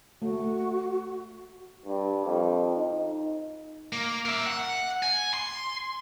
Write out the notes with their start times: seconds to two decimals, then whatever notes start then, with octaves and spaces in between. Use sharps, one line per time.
0.22 A3 F#4
1.86 G2
2.25 F2
2.76 D#4
3.93 A#3
4.26 A#4 E5
4.47 F#5
5.03 G#5
5.34 C6